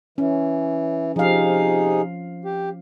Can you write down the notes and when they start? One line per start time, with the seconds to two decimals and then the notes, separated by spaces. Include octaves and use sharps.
0.18 E3 C#4
1.16 C3 F3 D#4 G#4 F5
2.45 G4